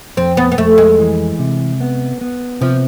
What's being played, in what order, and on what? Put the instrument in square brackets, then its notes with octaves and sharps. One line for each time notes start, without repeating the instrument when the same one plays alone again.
[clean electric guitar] F2 [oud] C4
[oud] B3
B3
[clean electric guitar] F2 [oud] A3
[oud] G#3
[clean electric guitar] E3
C3
B3
B3
[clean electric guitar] C3 [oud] F3